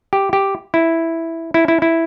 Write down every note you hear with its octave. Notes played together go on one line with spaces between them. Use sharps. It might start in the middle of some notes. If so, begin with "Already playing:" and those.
G4
G4
E4
E4
E4
E4